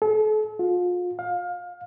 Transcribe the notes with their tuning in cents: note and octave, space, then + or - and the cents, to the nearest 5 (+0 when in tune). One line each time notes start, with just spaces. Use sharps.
A4 -40
F4 +35
F5 +25